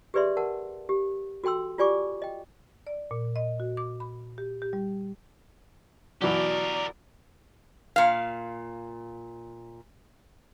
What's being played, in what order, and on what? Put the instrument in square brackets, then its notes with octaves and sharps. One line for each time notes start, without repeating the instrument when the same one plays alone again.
[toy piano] G4 G#4 B4 D5 E5 C6
A#4 F#5 A5
G4
F#4 A4 G5 C6 E6
F4 G4 D5 G#5 C#6 D6
D#5 G5
[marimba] D5
A#2
D#5
F#4
D6
B5
G4
G4
G3
[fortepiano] B2 E3 F#3 [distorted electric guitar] G4 A#4 [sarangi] D5
[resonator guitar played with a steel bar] A#2 F5